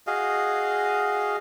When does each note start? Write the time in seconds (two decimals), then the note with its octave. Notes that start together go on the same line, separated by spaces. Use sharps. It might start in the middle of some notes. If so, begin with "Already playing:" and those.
0.07 F#4 G#4 D#5 F5